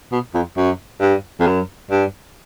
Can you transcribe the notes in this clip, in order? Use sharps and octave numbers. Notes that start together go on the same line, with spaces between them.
B2
F2
F#2
G2
F2
F#2
G2